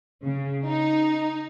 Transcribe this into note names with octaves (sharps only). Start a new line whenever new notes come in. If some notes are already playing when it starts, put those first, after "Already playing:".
C#3
D#4